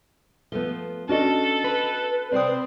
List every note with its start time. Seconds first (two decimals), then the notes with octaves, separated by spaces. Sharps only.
0.52 F3 A3 B3 G7
1.09 C#4 D4 F#4 A4 D#5
1.64 B4
2.32 C3 C4 C5 D5 G5 D#6